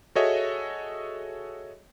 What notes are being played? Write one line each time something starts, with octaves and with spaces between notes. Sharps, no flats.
F#4 G#4 A4 C#5 D#5 E5